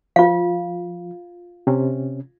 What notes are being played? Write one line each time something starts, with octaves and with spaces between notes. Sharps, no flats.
F3 F4 F5
C3 C#4